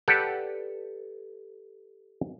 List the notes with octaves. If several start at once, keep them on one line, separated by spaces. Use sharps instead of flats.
G4 A4 B4 D5 F#5